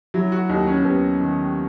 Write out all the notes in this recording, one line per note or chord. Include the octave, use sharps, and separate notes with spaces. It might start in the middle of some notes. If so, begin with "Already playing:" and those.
F#3 E4
F#4
D#2 D#4
C#4
D#2 B3
D#3